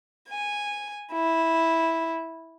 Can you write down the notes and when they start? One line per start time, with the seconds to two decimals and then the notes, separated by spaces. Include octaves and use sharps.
0.28 G#5
1.13 E4